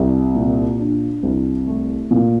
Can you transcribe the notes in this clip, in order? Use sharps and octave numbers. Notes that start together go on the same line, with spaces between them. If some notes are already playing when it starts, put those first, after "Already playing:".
Already playing: C2
A#2
D4
C2
A3
A#2